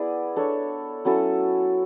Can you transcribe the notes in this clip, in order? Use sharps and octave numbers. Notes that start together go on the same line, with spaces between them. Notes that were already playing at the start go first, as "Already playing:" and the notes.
Already playing: B3 E4 G#4 D5
D4 A4 C#5
F#3 C#4 E4 A4